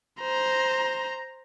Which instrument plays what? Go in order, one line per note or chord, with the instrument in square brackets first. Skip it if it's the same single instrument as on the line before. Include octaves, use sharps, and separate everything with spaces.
[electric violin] C5 A#5